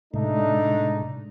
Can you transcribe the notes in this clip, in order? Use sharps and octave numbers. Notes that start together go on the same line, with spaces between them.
A2 C3 G#3 A3 D4 D#4